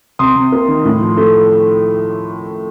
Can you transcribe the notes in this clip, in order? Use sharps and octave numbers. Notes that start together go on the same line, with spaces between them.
C3 C6 D#6
C3
A#3
D#3
A2
F3
A3